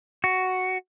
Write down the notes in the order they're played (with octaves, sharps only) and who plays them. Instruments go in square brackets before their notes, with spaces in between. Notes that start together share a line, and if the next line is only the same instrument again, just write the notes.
[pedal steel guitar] F#4